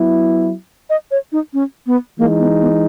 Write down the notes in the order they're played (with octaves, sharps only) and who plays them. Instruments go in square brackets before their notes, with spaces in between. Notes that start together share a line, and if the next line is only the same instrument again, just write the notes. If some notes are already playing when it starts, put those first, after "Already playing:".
Already playing: [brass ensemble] F#3 B3 E4
[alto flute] D#5
C#5
D#4
C#4
B3
[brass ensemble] E3 G#3 D#4 [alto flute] A#3
[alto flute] B3
B3